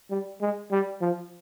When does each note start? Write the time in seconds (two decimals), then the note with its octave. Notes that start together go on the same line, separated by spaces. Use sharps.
0.10 G3
0.41 G#3
0.71 G3
1.01 F3